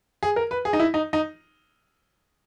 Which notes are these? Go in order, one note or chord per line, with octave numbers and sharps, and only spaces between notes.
G#4
A#4
B4
G#4
D#4
E4
D#4
D#4